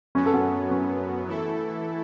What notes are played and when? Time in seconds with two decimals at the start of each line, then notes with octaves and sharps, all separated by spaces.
0.15 F#2 F#3 B3 C#4
0.26 A4
0.33 C#4 F#4
0.71 C#4
1.28 E3 A3 E4 A4